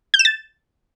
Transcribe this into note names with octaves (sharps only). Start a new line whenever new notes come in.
G6
E7
A6